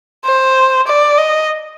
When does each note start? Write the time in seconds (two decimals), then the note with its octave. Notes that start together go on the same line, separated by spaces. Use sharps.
0.25 C5
0.87 D5
1.18 D#5